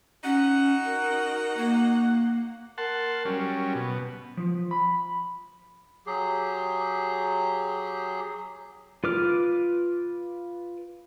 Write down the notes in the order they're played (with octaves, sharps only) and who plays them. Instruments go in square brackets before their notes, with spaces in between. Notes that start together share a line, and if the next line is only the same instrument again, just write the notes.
[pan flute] C#4 [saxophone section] D#4 F#4 F#5
[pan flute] A#4
A#3
[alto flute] A#4 [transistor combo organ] F#5 A5 C6
[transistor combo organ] F#3 G3 C#4
[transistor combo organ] B2 [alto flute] B4
[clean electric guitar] F3
B5
[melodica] F#3 G4 G#4
[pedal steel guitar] F4 B4 D6 F6